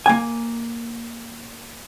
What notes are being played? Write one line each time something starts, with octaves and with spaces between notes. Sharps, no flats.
A#3 G#5